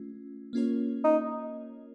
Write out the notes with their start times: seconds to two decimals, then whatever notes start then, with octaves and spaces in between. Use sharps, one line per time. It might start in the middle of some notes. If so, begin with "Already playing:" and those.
Already playing: A3 C#4 F4
0.53 A#3 C#4 F4 A#4 C#5
1.04 D#4